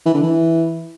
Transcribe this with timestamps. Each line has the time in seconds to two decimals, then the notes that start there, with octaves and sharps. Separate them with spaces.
0.06 E3
0.14 D3
0.23 E3